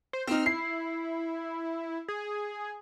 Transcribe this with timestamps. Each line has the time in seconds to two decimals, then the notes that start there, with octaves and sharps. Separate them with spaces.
0.13 C5
0.27 C4 D#4 F6
0.46 E4 C7
2.08 G#4